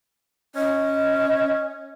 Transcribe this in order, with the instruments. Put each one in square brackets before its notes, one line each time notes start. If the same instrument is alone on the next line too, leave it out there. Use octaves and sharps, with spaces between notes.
[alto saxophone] C#4 [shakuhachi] D#5